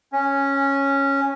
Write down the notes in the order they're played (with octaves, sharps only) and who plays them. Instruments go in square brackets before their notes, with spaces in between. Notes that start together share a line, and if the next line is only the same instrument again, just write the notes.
[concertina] C#4